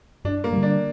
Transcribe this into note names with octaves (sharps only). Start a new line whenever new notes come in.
G2 D4
A#3
D3 G3
D4